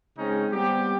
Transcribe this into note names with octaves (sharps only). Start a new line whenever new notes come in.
C#3 G#3 C4 C#4 D#4
G3 B3 C4 G4